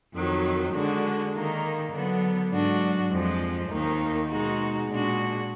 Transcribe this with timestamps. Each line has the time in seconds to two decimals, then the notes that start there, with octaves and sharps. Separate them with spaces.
0.15 F2 D#3 F#3
0.74 D3 G#3 D4 F#4
1.34 D#3 A#3 D#4
1.92 D3 F#3 B3
2.51 G#2 F#3 D4 F#4
3.11 F2 F3 G#3
3.70 D#2 D#3 A#3 D#4
4.29 B2 G#3 D#4 F#4
4.88 A#2 G#3 D4 F#4